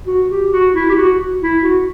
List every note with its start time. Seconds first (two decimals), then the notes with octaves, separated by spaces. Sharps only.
0.07 F#4
0.30 G4
0.52 F#4
0.74 E4
0.89 G4
0.96 F#4
1.42 E4
1.63 F#4